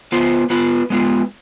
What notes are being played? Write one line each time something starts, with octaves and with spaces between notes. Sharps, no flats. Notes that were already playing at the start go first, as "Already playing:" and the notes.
B3 F4 C5
B3 F4 B4
G#3 B3 F4